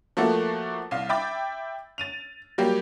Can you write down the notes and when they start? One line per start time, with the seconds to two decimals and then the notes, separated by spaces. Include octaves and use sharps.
0.17 F3 A3 A#3 F#4 A4
0.91 C2 F5
1.09 E5 G5 B5 D6 A6
1.98 A6 D#7 F7
2.58 F#3 G3 A#3 G4